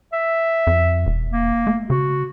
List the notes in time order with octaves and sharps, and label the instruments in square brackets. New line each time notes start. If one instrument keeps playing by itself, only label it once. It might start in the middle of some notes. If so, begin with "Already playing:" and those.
[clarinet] E5
[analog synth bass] F2
E1
[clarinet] A#3
[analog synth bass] A3
[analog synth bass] C#3 [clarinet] F#4